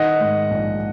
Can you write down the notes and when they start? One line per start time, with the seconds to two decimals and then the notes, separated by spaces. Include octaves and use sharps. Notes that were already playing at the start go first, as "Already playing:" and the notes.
Already playing: D#3 D#5 F#5
0.21 G#2
0.51 A#1